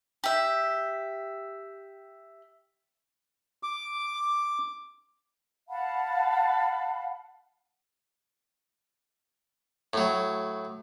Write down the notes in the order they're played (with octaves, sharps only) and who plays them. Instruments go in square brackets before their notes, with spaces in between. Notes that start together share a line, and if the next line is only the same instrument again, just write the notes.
[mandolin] G4 E5
[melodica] D6
[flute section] F5 F#5 A5 B5
[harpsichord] A2 F#3